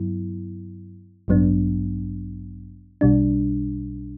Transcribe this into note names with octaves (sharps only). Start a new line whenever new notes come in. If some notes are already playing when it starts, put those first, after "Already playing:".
Already playing: G2 F#3 B3 E4
A1 G2 F#3 B3 D4
B1 B2 G3 D4